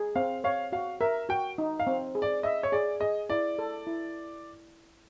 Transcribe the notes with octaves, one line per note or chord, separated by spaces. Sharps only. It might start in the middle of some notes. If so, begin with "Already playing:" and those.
Already playing: G#4
C4 F5
C#5 F5
F#4 F5
A#4 E5
F#4 G5
D#4
F5
C4
G#4
D5
D#5 E5
C#5
G#4 D5
G#4 D#5
E4 D5
A4
E4